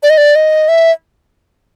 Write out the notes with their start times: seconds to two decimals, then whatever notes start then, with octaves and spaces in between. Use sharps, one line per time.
0.03 D5
0.10 D#5
0.18 D5
0.35 D#5
0.68 E5